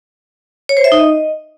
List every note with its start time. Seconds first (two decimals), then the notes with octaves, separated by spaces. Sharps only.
0.69 C#5
0.77 C5
0.84 E5
0.92 D#4
0.99 D#5